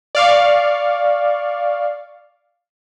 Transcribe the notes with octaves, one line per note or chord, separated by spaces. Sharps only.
D5 F5 C#6